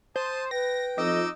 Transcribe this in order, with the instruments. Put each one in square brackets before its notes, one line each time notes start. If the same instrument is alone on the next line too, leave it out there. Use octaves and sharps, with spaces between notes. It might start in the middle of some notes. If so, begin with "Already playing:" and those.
[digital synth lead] C5 [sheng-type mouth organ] A5 D#6
[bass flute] B4 [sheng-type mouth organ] G5 [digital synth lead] A#6
[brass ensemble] F2 [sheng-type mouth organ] D#4 D6 E6 [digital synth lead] D#5